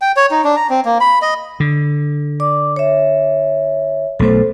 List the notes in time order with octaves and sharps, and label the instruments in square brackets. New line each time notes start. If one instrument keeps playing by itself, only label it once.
[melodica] G5
C#5
D#4
D4
A#5
C4
A#3
B5
D#5
[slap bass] D3
[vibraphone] D5 D6
C#5 E5
[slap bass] B1 A3 [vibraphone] A4 C5